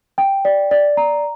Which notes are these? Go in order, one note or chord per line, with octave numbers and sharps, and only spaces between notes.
G5
D5
D5
A#5